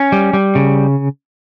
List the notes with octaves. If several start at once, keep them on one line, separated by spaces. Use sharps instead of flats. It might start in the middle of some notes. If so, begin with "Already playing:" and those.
Already playing: C#4
G3
G3
C#3